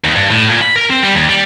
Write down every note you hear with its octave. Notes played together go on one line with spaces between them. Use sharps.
D#2
G2
A2
A#2
B5
A#4
C4
G3
D#2
G3